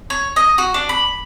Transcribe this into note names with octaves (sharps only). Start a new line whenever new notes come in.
C#5
D#5
F#4
D4
B5